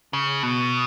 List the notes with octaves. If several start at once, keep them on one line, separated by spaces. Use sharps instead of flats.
C#3
B2